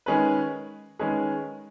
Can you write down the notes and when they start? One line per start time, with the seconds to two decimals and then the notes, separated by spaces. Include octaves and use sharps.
0.06 D#3 G#3 C#4 G#4 B4
0.99 D#3 G#3 C#4 G#4 B4